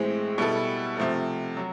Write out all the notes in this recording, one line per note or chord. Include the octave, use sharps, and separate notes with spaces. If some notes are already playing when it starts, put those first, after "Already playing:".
Already playing: A2 E3 G#3 C4
B2 G3 B3 E4 A4
C3 F3 A3
F#3